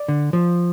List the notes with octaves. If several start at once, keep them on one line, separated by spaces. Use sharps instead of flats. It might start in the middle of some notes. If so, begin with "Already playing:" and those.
Already playing: D5
D3
F3